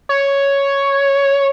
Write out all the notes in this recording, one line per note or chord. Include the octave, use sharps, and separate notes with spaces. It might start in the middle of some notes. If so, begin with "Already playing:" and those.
C#5